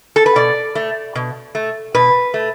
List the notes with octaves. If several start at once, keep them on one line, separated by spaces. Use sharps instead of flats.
A4
B4
B2 D5
A3
B2
A3
B2 B4
A3